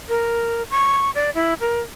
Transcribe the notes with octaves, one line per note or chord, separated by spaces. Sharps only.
A#4
C#6
D5
E4
A#4